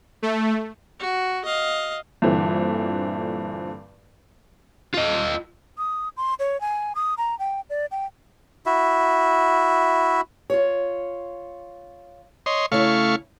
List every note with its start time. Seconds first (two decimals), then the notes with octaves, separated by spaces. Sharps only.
0.22 A3
1.00 F#4
1.45 D#5 F5
2.22 G2 A#2 D3 E3 C4
4.94 F4 D#5
5.78 D#6
6.17 C6
6.39 C#5
6.61 G#5
6.95 D#6
7.18 A#5
7.39 G5
7.70 D5
7.91 G5
8.66 E4 F#4 E5
10.50 F4 C#5
12.46 C#5 D#5 C6
12.72 C#3 A3 E4 F5 C#6